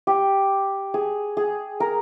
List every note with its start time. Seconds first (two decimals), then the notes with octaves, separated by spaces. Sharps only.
0.07 G4
0.94 G#4
1.37 G#4
1.80 A#4